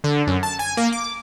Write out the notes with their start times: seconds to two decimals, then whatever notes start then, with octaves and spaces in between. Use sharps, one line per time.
0.04 D3
0.27 F#2
0.43 A5
0.59 G#5
0.77 A#3
0.92 D6